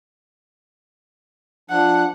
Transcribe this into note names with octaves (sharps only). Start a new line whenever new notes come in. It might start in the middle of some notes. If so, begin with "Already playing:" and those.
F3 D4 F#5